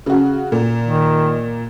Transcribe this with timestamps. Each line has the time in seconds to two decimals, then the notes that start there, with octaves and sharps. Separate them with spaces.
0.06 C#3 F#4
0.52 A#2
0.83 D#3